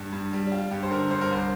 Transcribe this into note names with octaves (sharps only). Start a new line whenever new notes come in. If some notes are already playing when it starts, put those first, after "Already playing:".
Already playing: G2 G3
G2
G3
D4
G3 F4
G2 G4
C5
D3 A#4
G2 C5
A#4
C2 C5